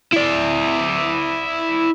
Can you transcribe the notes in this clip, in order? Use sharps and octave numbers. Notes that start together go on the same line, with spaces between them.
E4 D5